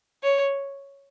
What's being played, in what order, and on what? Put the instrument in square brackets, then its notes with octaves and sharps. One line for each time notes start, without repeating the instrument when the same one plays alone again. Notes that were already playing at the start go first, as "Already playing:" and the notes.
[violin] C#5